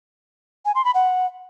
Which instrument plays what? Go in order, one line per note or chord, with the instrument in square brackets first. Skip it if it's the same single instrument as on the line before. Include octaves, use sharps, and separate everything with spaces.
[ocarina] G#5
C6
B5
F#5